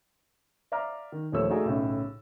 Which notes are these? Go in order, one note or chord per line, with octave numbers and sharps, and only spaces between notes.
D5 E5 F5 A#5 D6 F6
D#3
D#1 D#2 F3 A3 C#5 E6
A3 D#4 F#4 G#4 D5 G#5
B1 A2 C#3